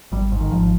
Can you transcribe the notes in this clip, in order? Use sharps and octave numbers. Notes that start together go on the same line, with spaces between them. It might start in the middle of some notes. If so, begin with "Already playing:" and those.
G#1 G3
G#2
D#3
G#1 F3